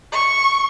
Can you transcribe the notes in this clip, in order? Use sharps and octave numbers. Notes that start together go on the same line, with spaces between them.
C#6